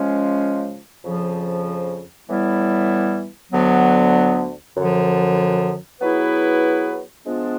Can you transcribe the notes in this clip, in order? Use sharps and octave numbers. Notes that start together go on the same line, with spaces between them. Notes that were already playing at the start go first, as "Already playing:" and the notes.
Already playing: C#3 F3 G#3 C#4
F2 C#3 F3
A2 E3 G3 B3 E4
D2 D3 F#3 B3
F#2 D3 F3
F#3 B3 E4 G#4 B4
F3 G#3 B3 D4 F4